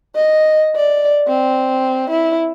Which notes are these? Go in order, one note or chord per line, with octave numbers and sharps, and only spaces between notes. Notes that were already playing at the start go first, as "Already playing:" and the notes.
D#5
D5
C4
E4